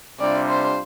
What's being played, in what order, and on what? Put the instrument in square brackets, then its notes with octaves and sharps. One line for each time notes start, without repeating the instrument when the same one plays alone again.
[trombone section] C3 G3 D4 F4 [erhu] D5
[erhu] C5